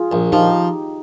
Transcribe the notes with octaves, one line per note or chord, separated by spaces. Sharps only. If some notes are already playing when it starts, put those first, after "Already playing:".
Already playing: F4 G#4
A#1
F3 D#4 G4